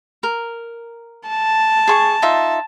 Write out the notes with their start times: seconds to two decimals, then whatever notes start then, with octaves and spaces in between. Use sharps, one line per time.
0.23 A#4
1.28 A5
1.88 G#4 C6 C#6
2.22 D#4 F4 E5